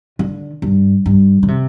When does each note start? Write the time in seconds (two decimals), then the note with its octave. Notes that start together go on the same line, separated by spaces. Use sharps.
0.19 D3
0.62 G2
1.06 G2
1.43 D3
1.48 C3